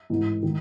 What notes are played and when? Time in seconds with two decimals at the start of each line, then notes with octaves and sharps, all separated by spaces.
0.10 A1 G#2 E3 A3
0.43 D#3